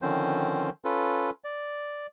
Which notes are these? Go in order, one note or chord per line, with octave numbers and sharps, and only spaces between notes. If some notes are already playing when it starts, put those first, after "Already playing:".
D3 D#3 F3 C4 C#4 C5
C#4 F4 A4 B4
D5